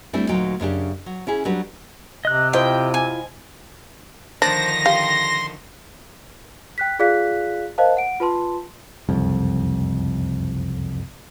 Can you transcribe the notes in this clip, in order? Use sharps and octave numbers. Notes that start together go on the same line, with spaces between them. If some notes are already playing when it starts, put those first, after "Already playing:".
G3 A3 C4 D4 E4
D2 A#2 F#3 D#4 G5
F#2 C#3 D4 G4
F#3
C#4 E4 G#4
F#3 G3 D4 G4 B4
C3 D#5 F#6
E4 F4 C5 D#5 G5
G#5
D3 D#3 F3 D4 C5 A#6
G4 F5 C6
G5 F#6 B6
F4 G#4 D5 F5 F#6 B6
A#4 C5 D#5 F5 A5
F#5 D7
F4 B4 A5 C6
F#1 C2 F2